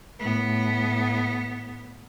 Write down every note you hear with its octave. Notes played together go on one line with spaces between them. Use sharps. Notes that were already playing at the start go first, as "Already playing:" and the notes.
A2 B3